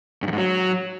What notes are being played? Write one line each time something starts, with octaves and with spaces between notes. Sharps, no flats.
G2
F2
G#2
F#3